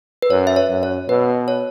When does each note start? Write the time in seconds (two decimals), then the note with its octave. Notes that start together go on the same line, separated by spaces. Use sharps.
0.22 B4
0.30 F#2 C#5
0.47 E5
0.56 C#5
0.70 F#2
0.83 C#5
1.09 B2 B4
1.48 C#5